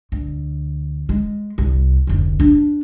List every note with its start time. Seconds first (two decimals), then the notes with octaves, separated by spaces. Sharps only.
0.12 D2
1.09 G#3
1.58 C2
2.07 F1 D2
2.40 D4